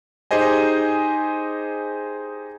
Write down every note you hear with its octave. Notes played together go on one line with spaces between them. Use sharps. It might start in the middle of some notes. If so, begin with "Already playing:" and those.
D#4 G4 G#4 C5 D#5 G#5